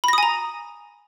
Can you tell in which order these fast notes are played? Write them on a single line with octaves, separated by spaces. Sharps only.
B5 A#6 D#6 G#5 A#5